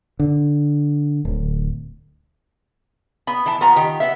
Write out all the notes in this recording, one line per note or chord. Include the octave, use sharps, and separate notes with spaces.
D3
D1
B3 B5
E3 A5
B3 F4 A#5
D#3 G4
B3 E5